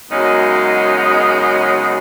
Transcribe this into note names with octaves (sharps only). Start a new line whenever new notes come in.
F#2 C#3 G#3 B3 D#4